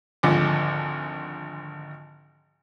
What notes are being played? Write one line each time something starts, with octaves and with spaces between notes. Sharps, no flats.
G#1 D2 F3 G#3 D6